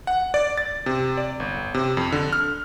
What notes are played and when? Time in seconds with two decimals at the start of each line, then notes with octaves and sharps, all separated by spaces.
0.07 F#5
0.34 D5
0.58 A6
0.86 C3
1.17 D5
1.40 G1
1.74 C3
1.97 F2
2.12 D3
2.33 F6